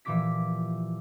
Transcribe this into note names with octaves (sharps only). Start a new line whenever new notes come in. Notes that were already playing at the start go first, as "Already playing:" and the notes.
A#2 E3 F3 G4 D6 B6